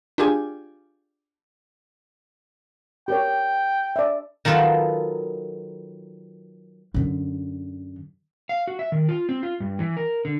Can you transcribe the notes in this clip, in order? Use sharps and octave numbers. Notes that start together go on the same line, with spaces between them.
D4 F4 G4 G#4 G#5
G4 A#4 C#5 G5
D5 E5
D#3 F#3 F4 A4 B4
F#2 D3
F5
F#4
E5
D#3
F4
C4
F4
G2
E3
A#4
D3